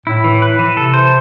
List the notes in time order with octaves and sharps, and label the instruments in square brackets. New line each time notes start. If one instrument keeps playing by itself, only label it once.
[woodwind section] A2 [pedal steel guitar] E4
[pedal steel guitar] E3
B4
E3
[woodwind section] C3 [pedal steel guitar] A4
[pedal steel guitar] C5